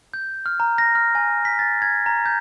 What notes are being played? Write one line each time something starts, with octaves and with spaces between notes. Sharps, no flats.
G6
F6
A#5
A#6
F6
G#5
B6
A6
G#6
A#5
G6